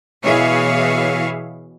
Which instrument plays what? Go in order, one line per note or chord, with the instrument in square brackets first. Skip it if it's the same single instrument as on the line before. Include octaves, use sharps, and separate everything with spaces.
[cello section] B2 E3 G#4 C#5 E5 F5